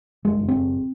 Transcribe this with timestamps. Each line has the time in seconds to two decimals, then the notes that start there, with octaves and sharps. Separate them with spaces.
0.25 F#1 G#3
0.39 F#1
0.48 C4
0.55 F#1